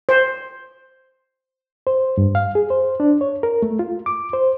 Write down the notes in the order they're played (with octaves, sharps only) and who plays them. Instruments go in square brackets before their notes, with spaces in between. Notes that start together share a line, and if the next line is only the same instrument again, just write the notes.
[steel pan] C5
[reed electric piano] C5
G2
F5
G#4
C5
D4
C#5
A#4
A3
F4
D6
C5